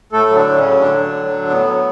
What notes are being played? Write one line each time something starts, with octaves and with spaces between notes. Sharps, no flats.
A2 A3 A4
F#3
D3 D4
A2
C#3 C#4
F#3
A2 D3 D4
F#3
A2
F#3
A2 B3
F#3